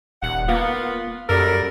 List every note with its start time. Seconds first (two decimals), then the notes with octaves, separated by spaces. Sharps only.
0.23 D#1 F#5
0.49 A#3 B3 F4
1.29 F#2 G3 A4 A#4